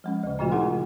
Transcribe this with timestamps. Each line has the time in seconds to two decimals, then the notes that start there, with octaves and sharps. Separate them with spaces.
0.04 F3 G#3 C#4
0.23 D2 C#3
0.39 A#2 C#3 F3 A3 F4 F#4
0.51 D#4 E4 G#4 A#4 F#5 C6